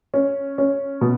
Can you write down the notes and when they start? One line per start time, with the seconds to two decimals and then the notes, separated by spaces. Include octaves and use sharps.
0.14 C#4
0.58 C#4
1.01 B2